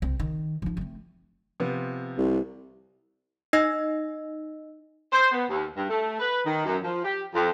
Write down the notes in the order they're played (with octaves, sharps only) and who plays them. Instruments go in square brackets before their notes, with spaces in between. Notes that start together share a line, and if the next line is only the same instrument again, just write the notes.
[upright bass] C2 C4
D#3
F3 D#4
A3 C4
[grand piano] C3 F3 B3
[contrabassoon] C2
[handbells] D#4 D#5 E6 A#6
[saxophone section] C5
B3
D#2
G2
A3
B4
D#3
F#2
F3
G4
F2